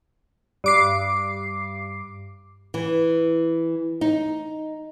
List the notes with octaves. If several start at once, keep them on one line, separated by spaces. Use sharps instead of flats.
G2 D6 C7
E3
D#4